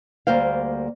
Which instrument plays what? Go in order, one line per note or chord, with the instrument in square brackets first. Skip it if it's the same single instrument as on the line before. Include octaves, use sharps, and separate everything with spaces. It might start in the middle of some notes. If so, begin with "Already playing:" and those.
[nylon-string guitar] D2 G3 A#3 C5 F5